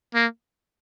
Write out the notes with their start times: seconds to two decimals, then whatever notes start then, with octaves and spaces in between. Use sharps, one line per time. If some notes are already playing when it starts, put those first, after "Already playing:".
0.15 A#3